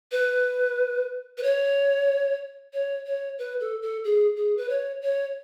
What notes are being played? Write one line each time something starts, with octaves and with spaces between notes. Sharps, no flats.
B4
B4
C#5
C#5
C#5
B4
A4
A4
G#4
G#4
B4
C#5
C#5